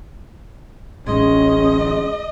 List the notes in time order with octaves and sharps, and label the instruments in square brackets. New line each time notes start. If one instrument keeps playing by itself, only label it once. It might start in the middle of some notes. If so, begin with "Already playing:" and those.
[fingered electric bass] D1 A1 G#3 [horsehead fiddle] C#4 [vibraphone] G#4 C6 [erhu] D#5